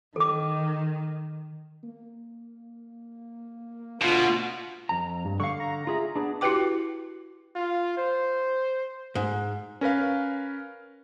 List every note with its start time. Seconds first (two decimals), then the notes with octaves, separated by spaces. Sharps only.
0.16 D#3 A4 D6
1.84 A#3
4.01 D2 B2 F4
4.89 F2 A#5
5.25 G2
5.40 D3 F5 C#6
5.60 A#5
5.87 F4 G#4 E5
6.15 B3 D4 G#4
6.41 E4 F#4 G4 B4 G5 D6
7.56 F4
7.97 C5
9.15 G#2
9.81 C#4 A#4 B4 F5